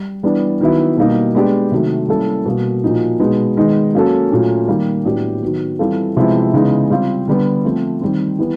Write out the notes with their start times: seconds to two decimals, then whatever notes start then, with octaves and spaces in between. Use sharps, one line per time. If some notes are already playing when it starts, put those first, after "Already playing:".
Already playing: G3
0.23 E3 G3 B3 D4
0.61 D#3 F#3 B3 E4
0.97 B2 G3 A#3 D#4
1.35 G#3 B3 D4 G4
1.72 C3 D#3 F#3 A3
2.09 G3 A#3 C#4 E4 A4
2.46 B2 G3 A#3
2.83 A#2 F3 A#3 D#4 F#4
3.20 B2 G#3 B3 D#4
3.57 D#3 G#3 B3 D#4
3.94 F#3 A#3 C#4 F#4 A4
4.31 A#2 F#3 A3 C#4
4.68 D#3 G3 A#3
5.05 A2 F#3 B3 D4 G4
5.42 D#3 F#3 B3
5.79 E3 G3 C4 F4 A4
6.17 C3 F3 G#3 B3 E4
6.54 C#3 E3 G#3 B3 D#4
6.90 G3 C4 F4
7.28 D3 G3 B3
7.64 F3 A3 C4
8.01 D#3 G3 C4
8.38 E3 G3 B3